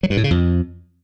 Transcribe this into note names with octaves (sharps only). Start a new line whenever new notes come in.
F#3
G2
A2
C#3
F2